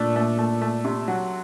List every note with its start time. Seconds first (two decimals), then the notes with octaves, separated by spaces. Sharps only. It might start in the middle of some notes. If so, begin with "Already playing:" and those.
Already playing: A#2 A3 D4
0.16 A3
0.38 A3
0.61 A3
0.85 C3
1.08 F#3